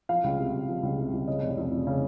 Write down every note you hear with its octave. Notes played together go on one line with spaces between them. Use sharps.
F3 F5
C#2
C3
C#2
F3
C#2
C3
C#2
C#3 D#5
F1
F2
F1
C#3